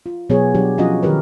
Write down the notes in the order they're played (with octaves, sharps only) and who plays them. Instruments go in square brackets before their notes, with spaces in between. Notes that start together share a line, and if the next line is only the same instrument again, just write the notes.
[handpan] F4
B2 F#3 B3 F#4 G#4 C#5
F#3 G3 D4 G4
F3 C#4 F4 F#4 D#5 F#5
D#3 G4 A#4 B4